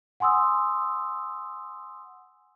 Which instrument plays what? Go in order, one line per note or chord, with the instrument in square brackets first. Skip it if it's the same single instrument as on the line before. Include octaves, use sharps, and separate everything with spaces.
[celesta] F#5 G#5 C6 D#6 E6